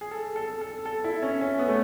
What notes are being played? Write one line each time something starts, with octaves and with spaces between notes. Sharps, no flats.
G#4
A4
A4
A4
A4
E4
C#4
C#4
B3
A3